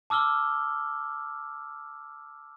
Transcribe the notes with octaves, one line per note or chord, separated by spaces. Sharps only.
A5 D6 E6 F6 G7